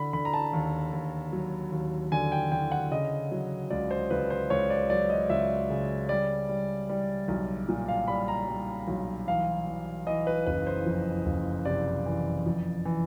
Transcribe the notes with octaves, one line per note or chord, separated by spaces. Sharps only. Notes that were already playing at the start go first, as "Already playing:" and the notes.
Already playing: D3 B5
D3 B5
A#5
A5
D#2
D#2
F#3
D#2
D3 G#5
G5
D3 G5
F#5
C#3 D#5
F#3
C#2 D5
C5
C#2 B4
C5
C#2 C#5
D5
F#3 D5
D#5
C#2 E5
C#3
G3 D5
G3
G3
B1
A#2
F5
G3 B5
A#5
G3
B1
E3 F5
E3
E3 D#5
B4
F#1 B4
C5
F2
F#1
C3 D5
E3
F2
E3